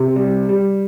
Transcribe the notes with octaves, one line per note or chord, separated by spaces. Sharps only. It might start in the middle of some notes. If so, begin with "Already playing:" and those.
Already playing: C3
G3
G3